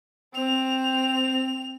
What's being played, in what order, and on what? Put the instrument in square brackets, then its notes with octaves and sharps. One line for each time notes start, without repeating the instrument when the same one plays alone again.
[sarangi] C4 [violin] F7